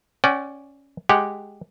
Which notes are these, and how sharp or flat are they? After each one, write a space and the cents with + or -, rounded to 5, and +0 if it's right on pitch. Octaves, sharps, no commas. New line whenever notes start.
C#4 +0 D5 +0 G5 -40
G#3 +0 G4 +0 F#5 +0